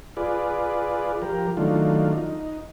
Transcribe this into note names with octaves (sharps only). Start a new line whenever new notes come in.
F4 G#4 B4 D5
F3 G4 A#4
D#3 F#3 A3 D4 F4
D#4